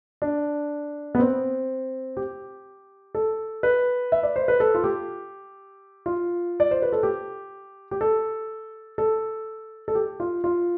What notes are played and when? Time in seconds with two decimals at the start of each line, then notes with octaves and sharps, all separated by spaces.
0.22 D4
1.15 B3
1.19 C4
2.17 G4
3.15 A4
3.63 B4
4.12 E5
4.23 D5
4.36 C5
4.48 B4
4.60 A4
4.75 F4
4.84 G4
6.06 F4
6.60 D5
6.71 C5
6.82 B4
6.92 A4
7.03 G4
7.91 G4
8.01 A4
8.98 A4
9.88 A4
9.95 G4
10.20 F4
10.44 F4